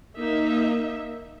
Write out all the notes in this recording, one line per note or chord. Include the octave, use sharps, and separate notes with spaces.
A#3 D#4 E5